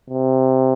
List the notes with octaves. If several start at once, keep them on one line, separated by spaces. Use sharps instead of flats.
C3